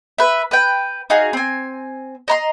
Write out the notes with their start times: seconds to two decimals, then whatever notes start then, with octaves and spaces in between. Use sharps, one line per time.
0.18 B4 E5
0.51 B4 G5
1.10 D#4 F#4 G#4 F5
1.33 C4 G#5
2.28 D#5 A#5 C6